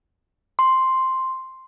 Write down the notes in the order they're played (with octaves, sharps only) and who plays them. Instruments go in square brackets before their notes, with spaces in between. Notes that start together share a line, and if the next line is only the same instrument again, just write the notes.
[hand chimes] C6